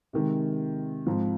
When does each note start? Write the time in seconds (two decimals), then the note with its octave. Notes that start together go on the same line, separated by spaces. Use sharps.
0.13 C3 D#3 G#3
1.06 G#2 F3 C4